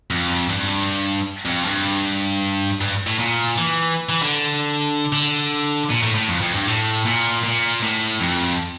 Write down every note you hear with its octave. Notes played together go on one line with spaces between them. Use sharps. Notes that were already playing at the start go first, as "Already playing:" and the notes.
F2
G2
F2
G2
G2
A2
A#2
E3
E3
D3
D3
A#2
A2
A2
F2
F2
G2
A2
A#2
A#2
A2
F2